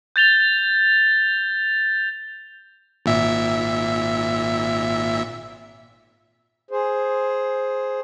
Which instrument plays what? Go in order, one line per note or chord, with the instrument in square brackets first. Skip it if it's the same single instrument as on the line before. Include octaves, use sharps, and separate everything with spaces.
[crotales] G6 A6 F7 G7
[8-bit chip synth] G#1 A#2 E5
[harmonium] G#4 C5